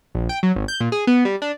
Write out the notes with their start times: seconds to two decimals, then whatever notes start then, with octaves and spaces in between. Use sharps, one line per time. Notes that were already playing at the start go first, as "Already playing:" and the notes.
0.15 A#1
0.29 G5
0.43 F#3
0.56 G#1
0.68 G6
0.80 A#2
0.92 G#4
1.07 B3
1.25 G3
1.42 D4